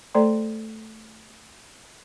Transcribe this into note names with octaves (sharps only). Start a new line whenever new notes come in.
A3 A4 C5 D5 A#5 C6